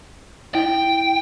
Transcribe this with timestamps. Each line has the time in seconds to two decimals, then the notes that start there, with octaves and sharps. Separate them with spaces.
0.55 E4 G5